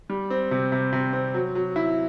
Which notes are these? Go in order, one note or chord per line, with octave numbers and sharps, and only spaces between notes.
G3
C4
C3
C3
C3
C4
F#3
F#3
E4